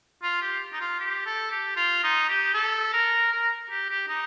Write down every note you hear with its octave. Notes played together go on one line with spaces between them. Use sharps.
F4
G4
D#4
F4
G4
A4
G4
F4
D#4
G4
A4
A#4
A#4
G4
G4
D#4